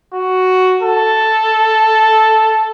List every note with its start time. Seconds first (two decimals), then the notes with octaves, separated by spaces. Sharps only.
0.13 F#4
0.82 A4